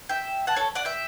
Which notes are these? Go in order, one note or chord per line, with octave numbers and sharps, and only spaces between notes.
E5 G5
F#5 A5
A4 C#5
D5 F#5
E5 G5